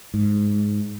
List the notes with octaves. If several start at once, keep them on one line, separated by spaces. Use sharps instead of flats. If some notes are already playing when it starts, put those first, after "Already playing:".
G#2